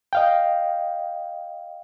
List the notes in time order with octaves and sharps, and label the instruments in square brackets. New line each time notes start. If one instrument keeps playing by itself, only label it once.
[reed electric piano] D#5 F5 G5